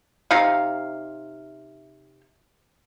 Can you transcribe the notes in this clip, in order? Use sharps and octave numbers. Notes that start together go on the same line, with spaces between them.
C3 D#4 F5